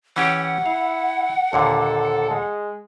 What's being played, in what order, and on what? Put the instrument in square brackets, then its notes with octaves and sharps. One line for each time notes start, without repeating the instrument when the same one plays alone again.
[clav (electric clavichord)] E3 C#4 G4 [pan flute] F#5
[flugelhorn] E4 [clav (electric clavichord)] F5
[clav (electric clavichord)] D#2 A#2 D3 [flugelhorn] A4
[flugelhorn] G#3